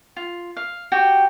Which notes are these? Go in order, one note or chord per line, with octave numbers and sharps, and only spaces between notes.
F4
F5
F#4 G4 G5